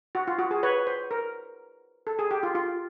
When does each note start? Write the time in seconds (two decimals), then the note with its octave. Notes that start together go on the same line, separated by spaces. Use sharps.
0.15 F#4
0.27 F4
0.39 F#4
0.51 G#4
0.63 B4 C#5
0.87 C5
1.11 A#4
2.07 A4
2.19 G#4
2.31 G4
2.43 F4
2.55 F4